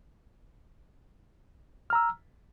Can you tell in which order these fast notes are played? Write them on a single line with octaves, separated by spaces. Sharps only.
F6 A#5 E6